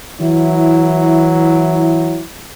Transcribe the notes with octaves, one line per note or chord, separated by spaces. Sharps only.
E3 F#3 E4